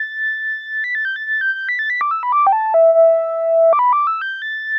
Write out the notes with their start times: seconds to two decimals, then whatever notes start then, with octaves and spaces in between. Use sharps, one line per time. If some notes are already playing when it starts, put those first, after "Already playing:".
Already playing: A6
0.84 B6
0.95 A6
1.05 G6
1.16 A6
1.26 A6
1.41 G6
1.55 G6
1.69 B6
1.79 A6
1.90 B6
2.01 D6
2.11 E6
2.23 B5
2.32 D6
2.47 G5
2.52 A5
2.74 E5
2.94 E5
3.73 D6
3.79 B5
3.93 D6
4.07 E6
4.21 G6
4.42 A6